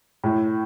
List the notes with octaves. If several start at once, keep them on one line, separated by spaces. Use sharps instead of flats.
A2